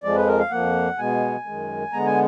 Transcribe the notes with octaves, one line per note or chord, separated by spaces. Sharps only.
F2 F3 G#3 D5
B4
A#4
F5
F2 F3 A#3 F#5
B2 G#3 B3 G#5
F#2 D#3 G#3
D3 G#3 B3 A#5
G#5